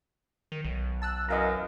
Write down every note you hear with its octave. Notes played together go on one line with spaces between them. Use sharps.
D#3
B1
A5 E6 F#6
F#2 E3 D#5 F5 A#5